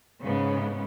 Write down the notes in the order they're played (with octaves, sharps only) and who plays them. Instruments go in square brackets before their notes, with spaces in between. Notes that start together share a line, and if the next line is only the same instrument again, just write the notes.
[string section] G#2 C#3 B3